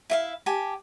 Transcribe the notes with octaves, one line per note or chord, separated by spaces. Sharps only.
E4 E5 F5
G4 G#5 A5